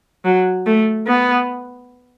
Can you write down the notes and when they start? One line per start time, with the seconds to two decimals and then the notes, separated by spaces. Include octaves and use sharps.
0.25 F#3
0.66 A3
1.07 B3